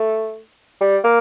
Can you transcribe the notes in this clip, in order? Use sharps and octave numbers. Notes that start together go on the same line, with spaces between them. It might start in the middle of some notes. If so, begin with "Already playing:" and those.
Already playing: A3
G3
A#3